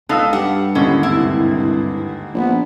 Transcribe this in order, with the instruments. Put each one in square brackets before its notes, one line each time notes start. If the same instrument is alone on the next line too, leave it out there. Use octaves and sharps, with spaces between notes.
[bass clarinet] C#2 [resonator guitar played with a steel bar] B3 D#4 [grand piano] A4 F5 E6
[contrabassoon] G2 [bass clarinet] G4 [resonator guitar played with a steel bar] F#5
[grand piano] D#2 G#2 D3 [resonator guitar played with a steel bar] C#4 [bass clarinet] E4
[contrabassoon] C2 [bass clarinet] G2 [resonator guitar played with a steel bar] E4
[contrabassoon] A#1 [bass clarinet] B3